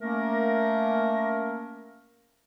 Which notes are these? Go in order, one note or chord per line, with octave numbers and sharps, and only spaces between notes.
A3 A#3 C#4 A#4